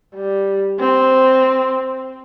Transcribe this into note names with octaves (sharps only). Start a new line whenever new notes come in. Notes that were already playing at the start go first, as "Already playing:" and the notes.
G3
C4